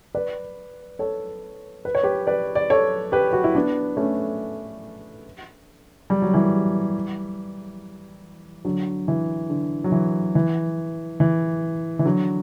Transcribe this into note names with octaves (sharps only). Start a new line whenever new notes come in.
B4 D5
A4 C#5
B4
C#5
G4 B4
B4 D5
D5
A4 C#5
G4 B4
F#4
E4
B3 D4
A3 C#4
G3
F#3
E3 G3
D3 F#3
E3
D3
F#3
E3
E3
E3
E3
D3 F#3